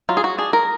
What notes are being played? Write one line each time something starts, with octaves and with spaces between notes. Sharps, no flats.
F#3 F4
G#4
F#4
D4 G#4
A#4